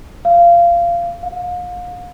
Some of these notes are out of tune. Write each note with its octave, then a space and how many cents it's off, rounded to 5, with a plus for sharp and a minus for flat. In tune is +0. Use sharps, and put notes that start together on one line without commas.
F5 -20
F5 +40